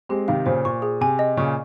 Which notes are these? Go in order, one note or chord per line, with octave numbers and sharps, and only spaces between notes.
G#3 C4 G4
C3 D#3 F5
A#2 C#3 C5
A#2 C#6
G#4
C3 G#5
D#5
A#2 C#3 C#6